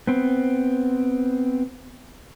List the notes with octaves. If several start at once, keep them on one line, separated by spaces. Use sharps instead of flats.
B3 C4